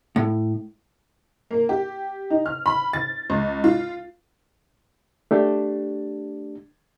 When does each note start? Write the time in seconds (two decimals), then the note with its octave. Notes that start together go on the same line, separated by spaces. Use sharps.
0.16 A2
1.51 A#3
1.69 G4
2.30 D#4
2.46 F6
2.66 B5
2.93 A6
3.30 C#2
3.64 F4
5.31 A3 D4 G4